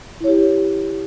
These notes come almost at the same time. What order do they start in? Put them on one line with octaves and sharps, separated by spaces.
E4 C#5 G4